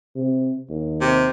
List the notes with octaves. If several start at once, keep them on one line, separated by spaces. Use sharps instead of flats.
C3
D#2
C3